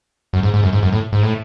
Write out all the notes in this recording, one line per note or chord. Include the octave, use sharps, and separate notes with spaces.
F#2
G#2
G#2
F#2
G#2
F#2
A2
G#2
A2